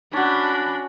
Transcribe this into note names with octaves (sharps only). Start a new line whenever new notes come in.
C#4 D4 F#4 B5